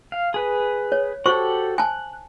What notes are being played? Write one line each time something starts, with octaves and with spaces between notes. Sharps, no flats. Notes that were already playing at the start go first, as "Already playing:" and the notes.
F5
G#4 B4
C#5
F#4 G4 A4 C5 C#6
G#5 A5 F#6